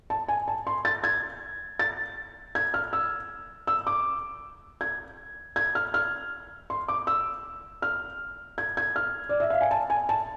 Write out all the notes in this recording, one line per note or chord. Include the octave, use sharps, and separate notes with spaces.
A5
G#5
A5
C6
A6
G#6
A6
G#6
F6
E6
E6
D6
G#6
G#6
F6
F6
C6
D6
E6
F6
G#6
G#6
F6
D5
E5
F5
G#5
A5
G#5
A5